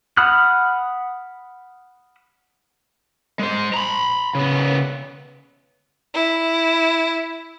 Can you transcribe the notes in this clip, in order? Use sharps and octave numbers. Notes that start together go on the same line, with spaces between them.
F#5 B5 D#6 F6 F#6
G#3 C5
A#5 B5
C#3 B3
E4